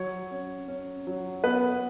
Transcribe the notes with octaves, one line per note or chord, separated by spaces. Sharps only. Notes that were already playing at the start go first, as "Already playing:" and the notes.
Already playing: F#3 C#5
C#4
C#4
F#3
B3 B4